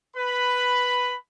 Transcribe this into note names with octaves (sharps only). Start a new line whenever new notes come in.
B4 B5